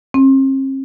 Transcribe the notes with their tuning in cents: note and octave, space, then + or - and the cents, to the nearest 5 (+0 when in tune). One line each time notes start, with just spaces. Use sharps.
C4 +45